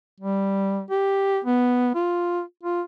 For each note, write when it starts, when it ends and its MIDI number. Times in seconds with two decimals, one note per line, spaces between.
0.20 0.84 55
0.90 1.39 67
1.45 1.91 59
1.95 2.41 65
2.63 2.82 65